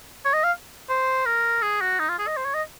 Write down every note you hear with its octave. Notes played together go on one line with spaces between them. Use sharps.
C#5
D#5
F5
C5
A#4
G#4
F#4
D#4
F4
G#4
D#5
C5
C#5
D#5